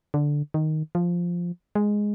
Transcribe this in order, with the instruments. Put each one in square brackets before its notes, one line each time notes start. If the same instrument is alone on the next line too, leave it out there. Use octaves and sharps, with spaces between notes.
[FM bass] D3
D#3
F3
G#3